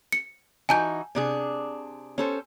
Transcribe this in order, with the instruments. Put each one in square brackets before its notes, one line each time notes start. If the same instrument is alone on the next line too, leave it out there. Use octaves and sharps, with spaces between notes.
[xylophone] C#7
[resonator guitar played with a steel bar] E3 D#4 F#4 [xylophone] G#5 A5 G6
[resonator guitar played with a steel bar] C3 D4 G#4
C#4 A4 C5